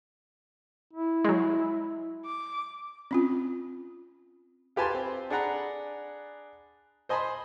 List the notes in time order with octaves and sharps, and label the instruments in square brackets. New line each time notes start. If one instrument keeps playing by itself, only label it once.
[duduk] E4
[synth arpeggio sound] F#3 G#3
[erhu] D6
[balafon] C4 C#4 F4
[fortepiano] F4 G4 B4 G#5 A5 C6
C4
D4 G#4 D5 F#5 A#5 B5
C5 D#5 G#5 A5 B5 C6